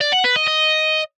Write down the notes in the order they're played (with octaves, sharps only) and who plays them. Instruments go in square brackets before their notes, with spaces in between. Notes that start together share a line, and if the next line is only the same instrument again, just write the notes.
[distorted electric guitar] D5
F#5
B4
D#5
D#5